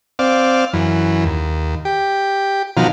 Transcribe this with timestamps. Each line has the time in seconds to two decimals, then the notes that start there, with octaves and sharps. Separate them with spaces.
0.19 C4 D5 F5
0.73 F#2 E3
1.24 D#2
1.85 G4
2.77 B2 D#3 F3 F#3 F5